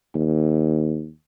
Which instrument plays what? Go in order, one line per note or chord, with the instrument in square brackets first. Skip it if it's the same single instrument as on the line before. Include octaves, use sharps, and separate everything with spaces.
[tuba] D#2